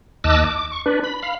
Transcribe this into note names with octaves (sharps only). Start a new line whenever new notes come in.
D#2 D#5 A5 D6 E6 F#6
D6
C#6
D4 B4
B5
F5 B5